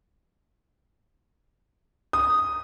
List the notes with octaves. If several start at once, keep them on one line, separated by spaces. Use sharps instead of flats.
D#6